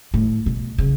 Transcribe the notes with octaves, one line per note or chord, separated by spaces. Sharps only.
A2
B2
C#3